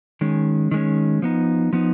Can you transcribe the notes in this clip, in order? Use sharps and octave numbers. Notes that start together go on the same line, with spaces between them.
D#3 G#3 C#4
D#3 G#3 C#4
F3 B3 D#4
F3 B3 D#4